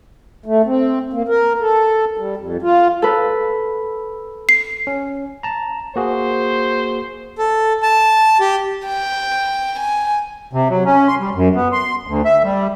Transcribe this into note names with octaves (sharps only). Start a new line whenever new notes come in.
A3
C4
A#3
A#4
A4
G3
F2
F4
A4 B4
C7
C#4
A5 A#5
A#3 F#4 G#4 C5
A4
A5
G4
G5
G#5
C3
F#3
C#4
C6
G3
F#2
B3
C6
D2
E5
G3